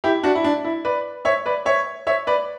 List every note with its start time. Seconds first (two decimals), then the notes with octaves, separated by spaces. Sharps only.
0.04 E4 G4
0.23 D4 F#4
0.35 E4
0.44 D4
0.64 E4
0.85 B4 D5
1.25 C#5 E5
1.46 B4 D5
1.66 C#5 E5
2.07 C#5 E5
2.27 B4 D5